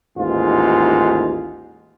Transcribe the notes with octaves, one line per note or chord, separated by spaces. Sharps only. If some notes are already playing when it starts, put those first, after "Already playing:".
A1 D#2 G#2 F4